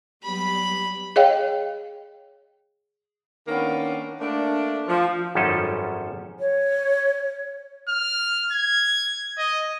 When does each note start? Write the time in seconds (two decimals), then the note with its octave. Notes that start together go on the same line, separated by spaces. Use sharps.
0.24 F#3 G3 B3 B5
1.16 G#4 C#5 D#5 F5 G5
3.48 D#3 A#3 B3 C#4 D4
4.21 A3 A#3 D4
4.88 F3
5.35 G#1 F#2 F3 G3 C#4 A4
6.40 C#5
7.89 F6
8.52 G#6
9.38 D#5